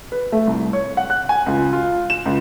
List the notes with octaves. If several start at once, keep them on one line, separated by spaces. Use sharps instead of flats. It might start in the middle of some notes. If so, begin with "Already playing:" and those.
B4
A3
C2
C#5
F#5
F#6
G#5
C#2
F4
E7
C#2